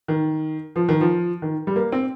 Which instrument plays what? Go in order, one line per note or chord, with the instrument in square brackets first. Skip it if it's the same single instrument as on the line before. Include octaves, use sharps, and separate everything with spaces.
[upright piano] D#3
F3
D#3
F3
D#3
G3
A#3
C4